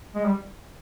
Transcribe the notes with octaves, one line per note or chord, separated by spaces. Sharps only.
G#3
G3